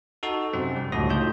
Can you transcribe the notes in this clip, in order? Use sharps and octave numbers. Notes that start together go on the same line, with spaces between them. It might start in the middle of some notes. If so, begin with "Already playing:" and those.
D#4 F#4 A4
F#2 C3 C4
G3
C#2 A2 D3 F#4 D#6 A#6
A2 D#4 F4 G6